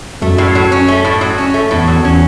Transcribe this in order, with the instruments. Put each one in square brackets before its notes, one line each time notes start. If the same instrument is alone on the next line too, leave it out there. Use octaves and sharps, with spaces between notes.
[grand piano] F#2 [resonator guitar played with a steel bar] A3
[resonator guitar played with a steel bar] A2
F#3
C#4
A3
A2
F#3
C#4
A3
[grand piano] E2 [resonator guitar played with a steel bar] A2
[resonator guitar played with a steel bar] F#3
[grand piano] E2
[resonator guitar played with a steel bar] C#4